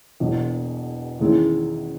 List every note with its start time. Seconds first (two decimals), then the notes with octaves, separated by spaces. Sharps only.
0.20 E1 E2 B2
1.20 E2 D#3 G#3 C#4 E4